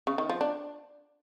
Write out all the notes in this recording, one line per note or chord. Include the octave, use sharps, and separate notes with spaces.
C#3
D#3
F3
D4